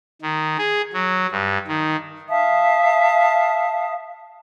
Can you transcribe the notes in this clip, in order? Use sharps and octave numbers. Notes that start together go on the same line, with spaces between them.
D#3
G#4
F#3
G2
D#3
E5 F5 A5 D#6